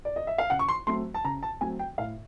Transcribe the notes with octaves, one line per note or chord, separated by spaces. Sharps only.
D5
D#5
E5
F5
C#3 F#5
C#6
C6
F#3 A3 C4 C6
A5
C#3 A#5
A5
F#3 A3 C4 G#5
G5
A2 F5